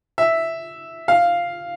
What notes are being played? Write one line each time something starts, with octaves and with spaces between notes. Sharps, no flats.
E5
F5